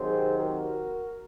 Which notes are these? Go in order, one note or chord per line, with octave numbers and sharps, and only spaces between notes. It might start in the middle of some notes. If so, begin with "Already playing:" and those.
Already playing: C3 D#3 F#3 C4 G#4 C5
F#4 A#4